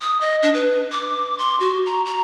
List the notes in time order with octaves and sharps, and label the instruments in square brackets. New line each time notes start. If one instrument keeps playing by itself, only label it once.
[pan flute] D#6
D#5
D4
B4
D6
C6
F#4
A#5
A#5